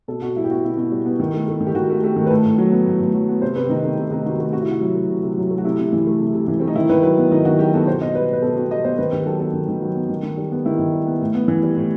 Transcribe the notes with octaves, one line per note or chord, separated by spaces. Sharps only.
B2 A4
B2 F#4
G3 E4
G4
B3 F#4
B2 E4
B2
G3
B3
D#3
A3
A3
D#3
G4
D#3 F#4
A3
A3 G4
D#3
B4
A2 A4
A2
F#3
B3
A2
A2
F#3
B3
C3 C5
C3 B4
C4
D#3 D#4
A3 C4
C3 D#4
C3 D#4
D#3 F#4
A3 F#4
C3 F#4
E4
C3 F#4
F#3
A3
C3
C3
F#3
A3
F#4
C3 E4
C3
E3
A3
C3
C3
E3
A3 C4
D#4
D#3 E4
D#3 B4
F#3 B4
B3
D#3 D#4
D#3 F#4
F#3 G4
B3 A4
B2 C5
B2 D#5
G3 B4
B3 B4
B2 A4
B2 G4
G3 D#5
B3 C5
D#3 B4
D#3 G4
F#3 A4
B3 A4
D#3
D#3
F#3
B3
D#3
D#3
G3
B3
D#3 E4
D#3
G3
B3
A2
B3
E3
G3
A2